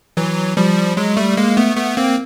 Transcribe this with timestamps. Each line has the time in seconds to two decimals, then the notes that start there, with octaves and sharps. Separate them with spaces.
0.17 E3 F#3
0.57 F3 G3
0.97 F#3 G#3
1.17 G3 A3
1.37 G#3 A#3
1.57 A3 B3
1.77 A3 B3
1.97 A#3 C4